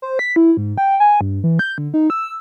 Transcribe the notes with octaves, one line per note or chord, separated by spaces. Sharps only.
C5
B6
E4
G#2
G5
G#5
G2
E3
G6
D3
D#4
E6